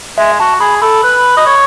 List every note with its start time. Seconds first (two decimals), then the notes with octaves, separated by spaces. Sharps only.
0.18 G#3 E5
0.40 F#4 A5
0.60 G#4 B5
0.82 A4 B5
1.03 B4
1.37 D#5
1.46 C#5